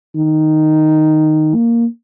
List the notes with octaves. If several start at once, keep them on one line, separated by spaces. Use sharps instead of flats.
D#3
A#3